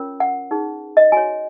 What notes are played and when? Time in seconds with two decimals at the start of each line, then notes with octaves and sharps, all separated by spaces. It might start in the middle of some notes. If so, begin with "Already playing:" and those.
Already playing: C#4 F4 A#4 C#5
0.20 F#5
0.51 D#4 G#4 B4
0.97 D#5
1.12 F#4 C#5 G#5